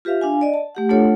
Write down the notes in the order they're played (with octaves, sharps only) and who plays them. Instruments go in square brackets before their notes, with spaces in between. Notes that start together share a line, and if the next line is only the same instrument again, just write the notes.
[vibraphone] F4 G4 B4 E5 F5
D4 F5 G#5
D5 D#5
A5
A3 G4 F#5
A3 D4 F4 A4 C#5 F#5